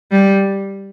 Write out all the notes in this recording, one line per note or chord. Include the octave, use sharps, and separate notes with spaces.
G3